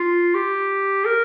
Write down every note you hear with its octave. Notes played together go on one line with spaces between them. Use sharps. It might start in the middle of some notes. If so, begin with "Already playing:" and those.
Already playing: F4
G4
A#4